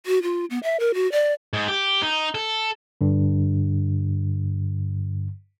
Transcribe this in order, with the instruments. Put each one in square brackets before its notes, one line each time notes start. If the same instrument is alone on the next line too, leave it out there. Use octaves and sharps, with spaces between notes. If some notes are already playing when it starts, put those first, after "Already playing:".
[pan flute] F#4
F4
B3
E5
A#4
F#4
D5
[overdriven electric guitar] G#2
G4
D#4
A4
[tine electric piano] G2 D3